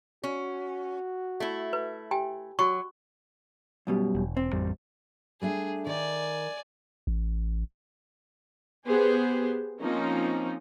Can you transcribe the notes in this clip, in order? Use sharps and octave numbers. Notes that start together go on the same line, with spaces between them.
C#4 F#4
A3 E4
B4
G4 G5 G#5
F#3 F#4 C#6
F#2 B2 G3
E1
C4
A1 F2 G3
G3 A3 D4 G#4
D#3 D5 G#5
A1
B3 G4 G#4 C5
F3 A#3 C4 C#4 D#4